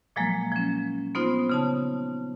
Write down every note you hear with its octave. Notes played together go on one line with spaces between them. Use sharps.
A#2 F3 F#3 G#3 A#3
F3 C#4
B3 C4 D#4 F4 C5
C#3 D#4 A5